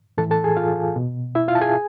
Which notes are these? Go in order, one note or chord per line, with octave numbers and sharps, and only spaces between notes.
A2 E3 A4 A5
A4 A5
G#4 G#5
F4 F5
B2
E4 E5
F4 F5
A5
G#4 G#5